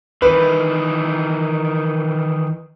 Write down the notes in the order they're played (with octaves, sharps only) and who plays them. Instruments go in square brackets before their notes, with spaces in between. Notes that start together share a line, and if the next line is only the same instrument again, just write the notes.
[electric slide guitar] D#3 E3 [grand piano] B4